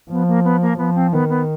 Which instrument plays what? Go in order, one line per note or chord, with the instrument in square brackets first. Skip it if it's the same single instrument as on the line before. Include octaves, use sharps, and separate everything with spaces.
[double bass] F3 [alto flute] B3
[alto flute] A#3
B3
A#3
[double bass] F3 [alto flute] B3
[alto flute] C4
[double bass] D#3 [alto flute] B3
[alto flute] B3